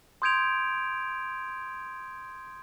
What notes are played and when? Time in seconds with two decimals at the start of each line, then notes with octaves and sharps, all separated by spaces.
0.22 C6 D#6 G6 G#6 D7 F7